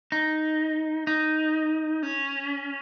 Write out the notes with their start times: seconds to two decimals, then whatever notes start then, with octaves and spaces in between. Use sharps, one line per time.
0.12 D#4
1.07 D#4
2.03 C#4